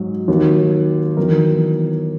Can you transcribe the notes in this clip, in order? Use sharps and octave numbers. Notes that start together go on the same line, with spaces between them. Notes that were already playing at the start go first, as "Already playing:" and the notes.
Already playing: G#2 F#3
D#2 D#3 F#3
E2 D#3 F#3 A#4